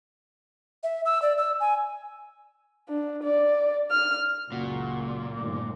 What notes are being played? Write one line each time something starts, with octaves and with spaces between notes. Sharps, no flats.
E5
E6
D5
E6
G#5
D4
D5
F6
F#1 C#2 A#2 F#4
G1 D#3 A3 D6